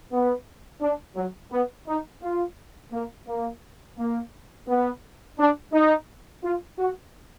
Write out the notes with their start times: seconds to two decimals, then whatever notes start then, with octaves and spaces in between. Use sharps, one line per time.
0.12 B3
0.81 D4
1.16 F#3
1.51 B3
1.87 D#4
2.22 F4
2.92 A#3
3.27 A#3
3.98 A#3
4.68 B3
5.39 D4
5.73 D#4
6.43 F4
6.79 F#4